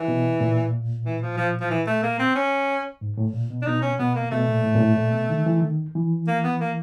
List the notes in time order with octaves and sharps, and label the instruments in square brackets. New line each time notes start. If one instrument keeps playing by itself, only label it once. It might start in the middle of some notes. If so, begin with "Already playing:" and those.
Already playing: [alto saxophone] E3
[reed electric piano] B2
A#2
[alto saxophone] E3
F3
F3
F3
E3
A3
A#3
C4
C#4
[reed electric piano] G#2
A2
A#2
B2
[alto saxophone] D4
[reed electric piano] B2 [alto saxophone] D#4
[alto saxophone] C#4
[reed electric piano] B2 [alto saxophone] B3
[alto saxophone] A#3
[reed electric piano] B2 [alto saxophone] A3
[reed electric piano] A#2
A2
A#2
A2
A#2
B2
D#3
E3
D#3
E3
[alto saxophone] A#3
B3
A#3